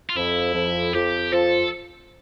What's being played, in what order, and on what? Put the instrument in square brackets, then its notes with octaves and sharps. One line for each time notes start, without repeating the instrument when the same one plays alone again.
[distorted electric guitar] F4
[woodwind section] F2 [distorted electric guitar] E4
[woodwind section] F2
[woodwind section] F2 [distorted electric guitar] G4
[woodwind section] F3 [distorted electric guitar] A4